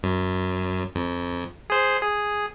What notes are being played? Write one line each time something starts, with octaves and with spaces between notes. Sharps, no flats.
F#2
F2
G#4 C5
G#4